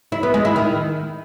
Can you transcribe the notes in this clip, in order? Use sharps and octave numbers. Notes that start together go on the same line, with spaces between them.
E4
B3
G#3
E4
D#3